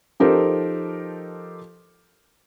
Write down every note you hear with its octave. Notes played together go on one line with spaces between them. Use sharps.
F3 D#4 G4 A4 A#4 C5